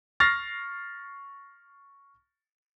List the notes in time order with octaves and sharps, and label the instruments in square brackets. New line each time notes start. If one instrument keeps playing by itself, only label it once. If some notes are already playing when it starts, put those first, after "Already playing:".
[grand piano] C#6 F6 A6 A#6 C7